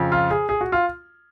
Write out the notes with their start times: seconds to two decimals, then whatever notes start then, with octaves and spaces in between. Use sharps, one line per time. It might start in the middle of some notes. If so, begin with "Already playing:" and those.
Already playing: F2 C#3
0.12 F4
0.31 G#4
0.49 G#4
0.61 F#4
0.72 F4